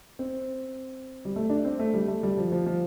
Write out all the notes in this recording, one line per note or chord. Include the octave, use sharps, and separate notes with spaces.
C4
G3
A3
D4
C4
A3
G3
A3
G3
F3
F3
F3